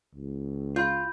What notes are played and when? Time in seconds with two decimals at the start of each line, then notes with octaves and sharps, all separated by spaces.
0.15 C#2
0.76 F4 B5 G6